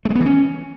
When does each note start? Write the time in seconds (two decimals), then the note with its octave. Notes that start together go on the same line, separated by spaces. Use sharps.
0.05 A3
0.10 G#3
0.15 B3
0.20 E3
0.26 C#4